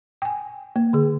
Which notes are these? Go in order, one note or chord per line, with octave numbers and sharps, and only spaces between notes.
G5 G#5
A#3
D3 G#4